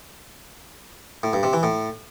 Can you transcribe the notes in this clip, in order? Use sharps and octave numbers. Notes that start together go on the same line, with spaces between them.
A2
G2
C3
E3
A2